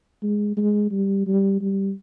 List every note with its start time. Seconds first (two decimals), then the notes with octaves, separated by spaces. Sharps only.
0.23 G#3
0.57 G#3
0.91 G3
1.27 G3
1.61 G3